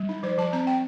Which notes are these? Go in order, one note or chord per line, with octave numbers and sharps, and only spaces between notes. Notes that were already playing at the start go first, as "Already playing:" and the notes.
Already playing: G3
D#4
F3 C5
F3 A5
C4 A#5
C4 G5